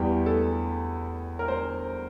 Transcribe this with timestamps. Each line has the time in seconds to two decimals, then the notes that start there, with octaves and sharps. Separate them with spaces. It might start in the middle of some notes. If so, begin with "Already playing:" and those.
Already playing: E2 E3 G3 G4
0.26 A4
1.39 A#4
1.48 C5